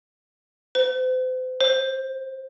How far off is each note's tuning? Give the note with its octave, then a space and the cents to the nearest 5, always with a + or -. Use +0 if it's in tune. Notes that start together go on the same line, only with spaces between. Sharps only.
C5 -40
C5 +20